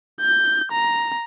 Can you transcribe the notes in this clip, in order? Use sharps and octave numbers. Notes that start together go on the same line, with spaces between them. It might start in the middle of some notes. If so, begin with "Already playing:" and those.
G6
A#5